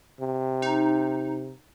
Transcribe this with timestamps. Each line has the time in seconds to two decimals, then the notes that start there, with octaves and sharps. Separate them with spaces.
0.20 C3
0.62 D#4